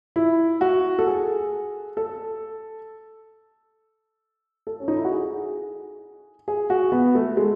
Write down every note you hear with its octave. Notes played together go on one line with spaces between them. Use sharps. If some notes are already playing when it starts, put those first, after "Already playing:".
E4
F#4
A4
G#4
A4
A4
C#4
D#4
E4
F#4
G#4
G#4
F#4
B3
A3
G#3